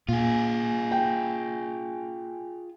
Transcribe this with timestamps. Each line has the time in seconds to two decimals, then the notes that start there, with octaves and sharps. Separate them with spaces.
0.08 A#2 F4 G#4
0.91 G5